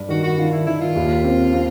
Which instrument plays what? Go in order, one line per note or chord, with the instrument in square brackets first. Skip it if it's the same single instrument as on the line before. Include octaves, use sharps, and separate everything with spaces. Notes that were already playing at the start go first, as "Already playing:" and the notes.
Already playing: [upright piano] G2
[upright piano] D#3 [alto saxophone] F#4
[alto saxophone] F#4
[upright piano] D#3 [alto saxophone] F4
[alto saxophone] E4
[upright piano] D#3 [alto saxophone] E4
[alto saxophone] F4
[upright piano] D#2
C4
C4